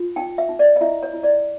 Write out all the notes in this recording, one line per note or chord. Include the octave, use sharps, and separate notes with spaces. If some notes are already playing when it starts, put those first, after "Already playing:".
Already playing: F4
D#4 G5
E5
D#4
D5
D#5
E4 E5
C#5
E4
D5